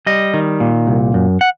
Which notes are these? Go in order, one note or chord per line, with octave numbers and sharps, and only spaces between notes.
G3 D#5
D#3
A#2
C2
F#2
F#5